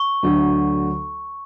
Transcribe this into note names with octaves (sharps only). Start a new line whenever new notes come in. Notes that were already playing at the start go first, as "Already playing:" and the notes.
Already playing: C#6
D2 D3 F#3